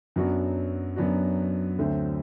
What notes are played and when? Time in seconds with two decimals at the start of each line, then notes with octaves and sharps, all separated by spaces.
0.16 F#2 F#3 B3 D4 F#4
0.96 F#2 F#3 B3 D4 F#4
1.79 D2 D3 F#3 C4